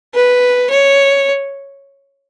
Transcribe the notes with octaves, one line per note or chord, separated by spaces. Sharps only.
B4
C#5